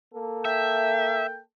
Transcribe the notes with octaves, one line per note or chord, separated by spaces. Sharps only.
A#3 A4
E5 G5